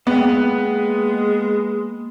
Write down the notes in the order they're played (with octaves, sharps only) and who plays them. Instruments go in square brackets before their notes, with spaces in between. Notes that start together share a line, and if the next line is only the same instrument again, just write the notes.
[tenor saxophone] G#3 [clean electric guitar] A#3 G5 [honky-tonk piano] B3